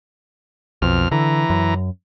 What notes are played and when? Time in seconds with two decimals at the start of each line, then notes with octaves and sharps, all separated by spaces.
0.82 B1 F2 F6
1.11 D3 E3 A#5
1.50 F#2